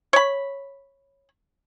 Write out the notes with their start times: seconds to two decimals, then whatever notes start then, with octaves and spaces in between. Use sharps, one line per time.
0.13 C#5 B5